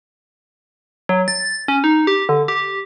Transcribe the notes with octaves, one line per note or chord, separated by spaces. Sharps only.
F#3
A6
C#4
D#4
G4
D3
G4